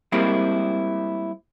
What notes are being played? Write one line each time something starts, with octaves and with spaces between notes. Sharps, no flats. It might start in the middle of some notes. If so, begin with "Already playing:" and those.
G3 G#3 A#3 C4 E4